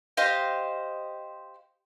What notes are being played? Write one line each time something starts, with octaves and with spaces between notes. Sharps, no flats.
G4 C5 D#5 F5